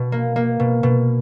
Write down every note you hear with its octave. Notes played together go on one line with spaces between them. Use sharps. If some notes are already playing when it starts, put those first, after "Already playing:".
Already playing: B2
A#3
A#3
B2
B2